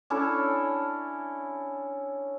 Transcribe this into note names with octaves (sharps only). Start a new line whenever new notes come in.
C#4 D4 E4 A4